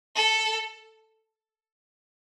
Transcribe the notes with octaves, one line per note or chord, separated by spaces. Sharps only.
A4